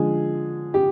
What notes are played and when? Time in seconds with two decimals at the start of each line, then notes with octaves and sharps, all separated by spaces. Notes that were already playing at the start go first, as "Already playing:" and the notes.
Already playing: D3 F3 G#3 G#4
0.74 G4